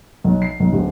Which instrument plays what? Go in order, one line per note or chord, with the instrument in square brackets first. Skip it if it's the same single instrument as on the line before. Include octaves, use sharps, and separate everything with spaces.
[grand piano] B1
C7
B1
D1